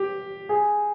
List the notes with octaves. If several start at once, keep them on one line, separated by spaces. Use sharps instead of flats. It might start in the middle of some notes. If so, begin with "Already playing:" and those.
Already playing: G4
G#4